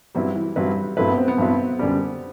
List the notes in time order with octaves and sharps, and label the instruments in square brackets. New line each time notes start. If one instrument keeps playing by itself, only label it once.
[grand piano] G2 F#3 C4 E4 B4 [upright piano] G3
[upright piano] E3
[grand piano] G2 F#3 C4 E4 B4 [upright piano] G3
[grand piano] G2 F#3 C4 E4 B4 [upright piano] A3
[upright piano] B3
C4
B3
[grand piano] G2 F#3 C4 E4 B4
F#2 D3 G3